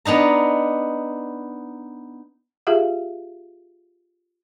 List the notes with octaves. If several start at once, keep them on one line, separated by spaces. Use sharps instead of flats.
B3 D4 D#4 A#5
F4 G4 G#4 E5 F5